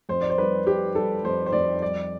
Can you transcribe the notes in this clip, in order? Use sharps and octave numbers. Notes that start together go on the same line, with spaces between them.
F2 C5
D5
C5
G3 B4
G3 G4
G3 A4
F2 C5
C5
F2 D5
G3 D5